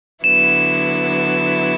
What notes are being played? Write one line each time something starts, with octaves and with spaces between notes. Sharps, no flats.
D3 F#3 B3 E4 E7